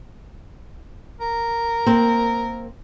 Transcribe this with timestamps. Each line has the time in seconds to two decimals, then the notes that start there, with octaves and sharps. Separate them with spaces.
1.20 A#4
1.86 A#3 C4